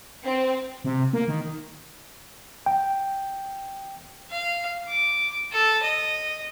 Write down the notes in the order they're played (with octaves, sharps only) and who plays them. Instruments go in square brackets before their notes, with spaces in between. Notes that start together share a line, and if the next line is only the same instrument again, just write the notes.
[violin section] C4
[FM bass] C3
A#3
D#3
[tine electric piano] G5
[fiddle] F5
D6
A4
D#5